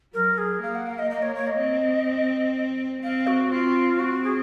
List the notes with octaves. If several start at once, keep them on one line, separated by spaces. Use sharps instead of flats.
F#3 A#4
G#4
A#3 F5
F#5
F5
D#5
D#5
C#5
C#5
D#5
C4
C4 F5
F#4
C4 F4
C4 F#4
G#4